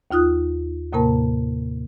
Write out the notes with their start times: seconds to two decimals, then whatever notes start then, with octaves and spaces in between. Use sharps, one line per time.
0.11 D#2 D#4 F4 D#6 F#6
0.93 D#2 A2 C3 A#3 A#4 A5